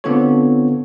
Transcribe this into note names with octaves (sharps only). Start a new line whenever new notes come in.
D3 B3 C4 F4 A4 C#5